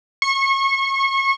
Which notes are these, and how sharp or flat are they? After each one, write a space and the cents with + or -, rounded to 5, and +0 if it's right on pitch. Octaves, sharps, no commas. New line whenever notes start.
C#6 -30